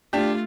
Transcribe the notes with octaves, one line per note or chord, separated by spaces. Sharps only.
A3 D4 F4 G4